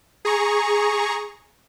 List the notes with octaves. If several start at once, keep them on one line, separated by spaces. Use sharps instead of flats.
G#4 A#5 C#6